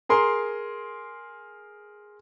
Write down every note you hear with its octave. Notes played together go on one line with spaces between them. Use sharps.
G#4 A#4 C6